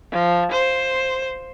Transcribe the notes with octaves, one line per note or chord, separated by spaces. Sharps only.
F3
C5